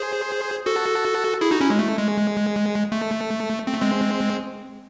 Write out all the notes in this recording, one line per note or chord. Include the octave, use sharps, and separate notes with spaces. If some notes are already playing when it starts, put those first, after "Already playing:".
Already playing: G#4 C5
F#4 A4
E4 G#4
D#4 F#4
C#4 E4
G#3
A3
G#3
A3
C4
A3
G#3 C4